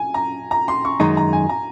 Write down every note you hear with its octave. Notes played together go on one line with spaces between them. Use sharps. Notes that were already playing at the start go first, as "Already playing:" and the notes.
Already playing: G#5
A#5
A#5
C6
C#6
F#2 D#3 G#3 D#4 A#5
A#5
G#5
A#5